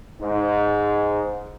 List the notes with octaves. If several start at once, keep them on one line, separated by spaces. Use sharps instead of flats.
G#2